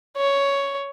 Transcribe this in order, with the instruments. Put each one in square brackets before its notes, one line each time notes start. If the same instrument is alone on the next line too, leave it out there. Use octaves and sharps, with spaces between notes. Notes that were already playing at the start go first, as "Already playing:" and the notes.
[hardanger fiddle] C#5